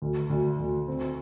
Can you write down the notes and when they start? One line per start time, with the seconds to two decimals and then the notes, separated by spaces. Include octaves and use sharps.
0.02 D2
0.30 D2
0.59 D2
0.88 C4